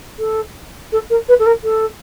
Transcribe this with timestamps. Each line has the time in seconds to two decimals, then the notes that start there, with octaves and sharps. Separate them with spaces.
0.19 A4
0.92 A4
1.10 A#4
1.28 B4
1.39 A4
1.46 A#4
1.63 A4